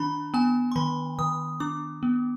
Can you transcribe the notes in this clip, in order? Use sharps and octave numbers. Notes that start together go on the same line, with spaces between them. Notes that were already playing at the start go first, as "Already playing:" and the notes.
Already playing: D#3 D4 B5
B3 G#5
C6
D#3 B5
D#3 D#6
D4 D6
B3